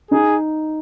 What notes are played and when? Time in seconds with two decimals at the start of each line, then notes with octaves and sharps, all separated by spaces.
0.11 D#4 G#4